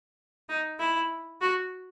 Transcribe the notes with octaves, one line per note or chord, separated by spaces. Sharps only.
D#4
E4
F#4